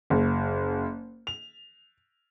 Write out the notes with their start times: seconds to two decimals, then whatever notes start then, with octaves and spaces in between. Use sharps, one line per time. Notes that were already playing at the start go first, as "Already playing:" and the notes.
0.10 F#1
1.27 F7